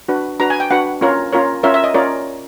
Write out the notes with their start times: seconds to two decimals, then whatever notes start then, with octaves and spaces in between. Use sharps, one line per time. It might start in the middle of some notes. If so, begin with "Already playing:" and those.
0.08 D4 F#4 B4
0.39 D4 F#4 B4 A#5
0.50 G#5
0.60 G5
0.70 D4 F#4 B4 F#5
1.01 C#4 F4 A#4 C#5
1.33 C#4 F4 A#4 C#5
1.63 C#4 F4 A#4 C#5 E5
1.74 E5
1.84 D#5
1.94 C#4 F4 A#4 C#5 D5